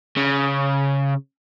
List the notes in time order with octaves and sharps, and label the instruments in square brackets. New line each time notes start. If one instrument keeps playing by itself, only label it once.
[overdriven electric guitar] C#3